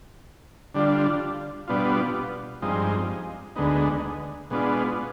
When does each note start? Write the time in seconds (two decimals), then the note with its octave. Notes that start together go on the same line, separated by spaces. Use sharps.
0.74 D3 G3 D4 F4
1.68 B2 G3 B3 D4 F4
2.62 G2 F3 G#3 C4 D#4
3.56 D2 D3 G#3 B3 D#4
4.50 B2 G#3 B3 D4 F4